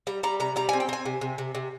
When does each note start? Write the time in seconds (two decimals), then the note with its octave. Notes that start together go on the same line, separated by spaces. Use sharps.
0.07 G3 A#5
0.23 G3 A#5
0.40 C3 A#5
0.56 G3 A#5
0.69 C4 G#5
0.80 G5
0.89 C4 G#5
1.05 C3
1.21 C3
1.38 C3
1.55 C3